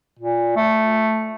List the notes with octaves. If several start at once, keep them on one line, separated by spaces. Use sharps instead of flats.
A#2
A3